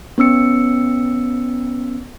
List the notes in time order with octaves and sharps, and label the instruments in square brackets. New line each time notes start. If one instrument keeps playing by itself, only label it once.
[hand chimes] B3 C#4 E6 C#7